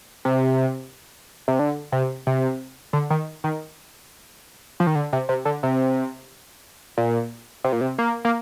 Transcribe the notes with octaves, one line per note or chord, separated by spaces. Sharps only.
C3
C3
D3
C3
C3
D3
D#3
D#3
F3
D#3
D3
C3
C3
D3
C3
A#2
C3
A#2
C3
A#3
A#3